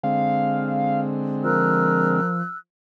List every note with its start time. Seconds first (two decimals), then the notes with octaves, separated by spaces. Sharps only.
0.04 D3 G#3 C4 F5
1.44 F3 A#4 E6 F#6